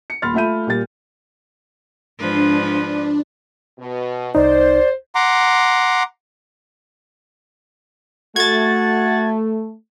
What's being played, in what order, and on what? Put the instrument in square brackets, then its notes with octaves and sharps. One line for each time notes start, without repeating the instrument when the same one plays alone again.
[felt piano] C#7
D#1 B5 C6 F6 A6
A3 F4 E5 B5 G6 D#7
A#2 G3 A6
[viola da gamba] G#2 F3 B4 [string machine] D4
[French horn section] B2
[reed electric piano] C2 D#4 [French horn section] C5 [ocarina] D5
[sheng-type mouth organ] F#5 A#5 C6 D6
[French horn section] A3 [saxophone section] F#4 [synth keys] G#6 A6